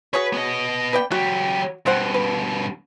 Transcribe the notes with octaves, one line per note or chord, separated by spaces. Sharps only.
F#4 G#4 B4 C#5
B3 D#5
B4 D5 G5
F#3 F#4 G4
G2 B2 C4 C5 F#5
B4